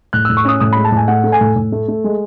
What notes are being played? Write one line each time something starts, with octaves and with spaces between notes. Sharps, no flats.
A2 F#6
A2 E6
C#6
C#4 D#6
A2 D#6
G#3 B5
A5
A2 G#5
A3 F#5
A3
G#5
A2
A2
A3
A3
G#3